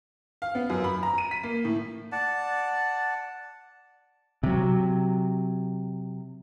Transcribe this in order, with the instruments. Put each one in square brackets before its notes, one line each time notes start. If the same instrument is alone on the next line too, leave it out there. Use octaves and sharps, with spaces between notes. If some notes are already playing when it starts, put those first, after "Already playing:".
[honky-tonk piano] F5
B3
F#2
B5
A#5
D#7
B6
A#3
A2
[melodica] D5 F#5 A5
[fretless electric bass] C3 F#3